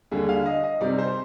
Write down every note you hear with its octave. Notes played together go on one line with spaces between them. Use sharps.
D#2 D3 G3 D4 G#4
F5
D#5
D#5
C3 G3 C4 D#4 D5
C5